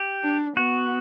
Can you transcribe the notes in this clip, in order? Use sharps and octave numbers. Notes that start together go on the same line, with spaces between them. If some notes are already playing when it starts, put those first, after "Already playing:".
Already playing: G4
D4
B3 F#4